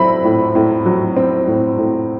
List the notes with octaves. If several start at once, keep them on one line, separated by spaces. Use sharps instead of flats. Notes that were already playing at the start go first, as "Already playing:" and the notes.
Already playing: A2 F#3 C4 E5 B5
A2
A2
F#3
C4
A2
A2